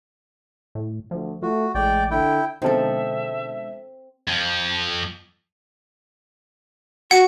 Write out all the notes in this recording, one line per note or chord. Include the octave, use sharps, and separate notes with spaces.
A2
D2 F3
A3 F4 F#4
A1 G#3 D5 G5
D3 E4 G5
B2 D3 F3 G#3 C4 D#4 A4 E5
F2 F3
F#4 F#5 C#7